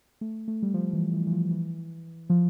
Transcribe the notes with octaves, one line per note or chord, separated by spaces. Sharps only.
A3
A3
G3
F3
E3
E3
E3
F3
E3
F3